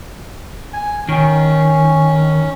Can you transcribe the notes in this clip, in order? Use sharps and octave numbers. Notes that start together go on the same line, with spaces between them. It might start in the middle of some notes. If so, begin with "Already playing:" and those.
G#5
D#3 C#4